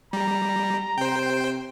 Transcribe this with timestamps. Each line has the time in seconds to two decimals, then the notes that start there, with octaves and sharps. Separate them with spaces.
0.13 G3 A#5
0.98 C3 C5 G5